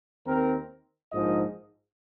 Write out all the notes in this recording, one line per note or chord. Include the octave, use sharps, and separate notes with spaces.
D#2 D#3 C4 A#4
A#1 G#2 F3 A#3 D#4 D#5